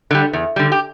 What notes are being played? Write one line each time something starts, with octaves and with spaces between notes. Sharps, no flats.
D3 G3
E2
D3 G3
G4